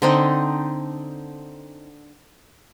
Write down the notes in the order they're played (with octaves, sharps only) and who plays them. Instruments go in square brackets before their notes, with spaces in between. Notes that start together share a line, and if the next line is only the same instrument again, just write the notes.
[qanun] D3 C4 D#4